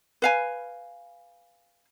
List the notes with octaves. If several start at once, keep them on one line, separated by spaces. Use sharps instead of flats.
B4 F5 G#5